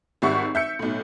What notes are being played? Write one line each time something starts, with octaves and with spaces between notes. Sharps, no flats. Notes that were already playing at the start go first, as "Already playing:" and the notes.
G#1 G#2 G3 E5 F#5 C#6
E5 G6 C#7
B1 A2